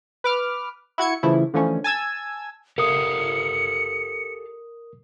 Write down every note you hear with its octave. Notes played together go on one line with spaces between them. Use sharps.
B4 D6 F6
E4 F#4 G#6 C#7
C#3 E3 F3 A3 E4
D3 E3 F3 A3 C#4
G#5 A5 E6 G#6
G4 A4 A#4 F5 D#6 C#7